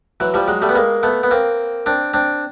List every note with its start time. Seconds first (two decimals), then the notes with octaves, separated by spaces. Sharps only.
0.20 E3 F#3
0.34 F3 G3
0.48 F#3 G#3
0.62 G3 A3
0.69 B3
0.75 G#3 A#3
1.03 A3 B3
1.23 B3
1.31 A#3 C4
1.86 C4 D4
2.14 C4 D4